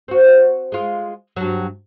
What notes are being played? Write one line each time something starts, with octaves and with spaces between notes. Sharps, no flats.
C4 F#4
G#3 F4
G2 F#3